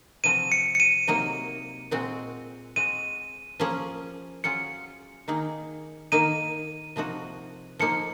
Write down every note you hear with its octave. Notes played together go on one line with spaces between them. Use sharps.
C3 F3 C4 F#4 D#7
C#7
C#7
D#7
C3 F#3 A#3 D#4
A#2 G#3 C4 F#4
G#3 C4 F#4 D#7
F3 A#3 C#4 G#4
F#3 C#4 F4 G#4 C#7
D#3 A#3 D#4 G#4
D#3 A#3 D#4 D#7
C3 F3 A#3 D#4 F#4
F3 A#3 D#4 C#7